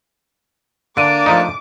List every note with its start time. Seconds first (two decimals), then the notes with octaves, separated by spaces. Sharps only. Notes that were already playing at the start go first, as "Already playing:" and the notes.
0.97 D3 A#3 D4 A5 D6 D7 D#7
1.26 F3 A3 D#4